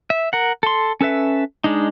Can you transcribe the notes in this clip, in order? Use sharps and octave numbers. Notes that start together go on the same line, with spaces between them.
E5
A#4 F#5
A4 C6
C#4 A4 B4 E5
G#3 D4 D#4